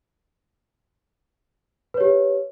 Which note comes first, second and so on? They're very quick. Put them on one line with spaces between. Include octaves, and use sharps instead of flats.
B4 C#5 G4